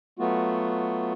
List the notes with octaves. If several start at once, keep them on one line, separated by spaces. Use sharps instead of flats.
F#3 A3 B3 F4 F#4